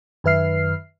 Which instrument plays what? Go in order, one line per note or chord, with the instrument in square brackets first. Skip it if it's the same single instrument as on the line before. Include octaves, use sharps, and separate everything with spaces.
[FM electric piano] F#2 D#3 B4 E5 F6 C7